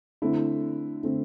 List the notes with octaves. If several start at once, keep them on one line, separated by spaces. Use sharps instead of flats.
D3 A3 C4 E4
D3 A3 C4